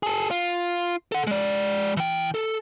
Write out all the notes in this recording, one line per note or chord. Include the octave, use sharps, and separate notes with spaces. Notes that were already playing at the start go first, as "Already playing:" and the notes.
G#4 A4
F4
A4 F#5
G#3 D5
E3 G5
A4